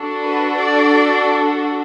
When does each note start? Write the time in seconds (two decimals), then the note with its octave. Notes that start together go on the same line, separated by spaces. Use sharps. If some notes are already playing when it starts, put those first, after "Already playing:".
Already playing: D4 F#4 A4
0.23 B4
0.57 D5